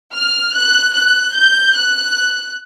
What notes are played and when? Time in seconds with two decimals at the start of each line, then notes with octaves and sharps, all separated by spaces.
0.14 F6
0.54 F#6
0.94 F#6
1.35 G6
1.74 F#6